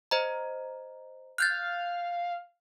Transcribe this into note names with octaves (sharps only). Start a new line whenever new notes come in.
C5 D#5 A#5
F5 F#6 G6 A6